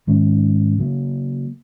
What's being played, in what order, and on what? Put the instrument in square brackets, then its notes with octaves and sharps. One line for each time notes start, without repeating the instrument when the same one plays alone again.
[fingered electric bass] G#2 D#3 G#3 C#4
C#3 F#3 A#3